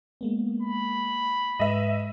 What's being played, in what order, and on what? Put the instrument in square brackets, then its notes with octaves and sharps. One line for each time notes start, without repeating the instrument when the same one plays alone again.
[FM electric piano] G#3 A#3 B3
[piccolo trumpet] B5
[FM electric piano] G#2 G#3 B4 [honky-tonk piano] D#5 E5